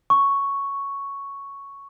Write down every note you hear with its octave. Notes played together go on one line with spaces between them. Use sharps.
C#6